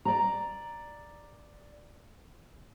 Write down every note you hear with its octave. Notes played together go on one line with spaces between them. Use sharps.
D5 A#5